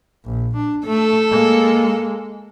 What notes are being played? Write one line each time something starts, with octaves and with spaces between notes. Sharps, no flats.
A#1
D4
A3 A4
G#3 A#3